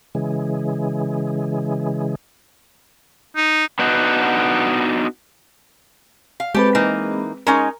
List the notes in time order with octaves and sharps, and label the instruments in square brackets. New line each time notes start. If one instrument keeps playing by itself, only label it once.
[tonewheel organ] C#3 E3 G#3
[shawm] D#4
[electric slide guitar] B3 D4 D#4 F#4
[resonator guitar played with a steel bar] F5
[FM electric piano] G#3 C4 B4 [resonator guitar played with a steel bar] G4 A4
[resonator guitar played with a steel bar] E3 A#3 D#4
[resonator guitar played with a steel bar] G#3 C#4 D#4 [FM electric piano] A#4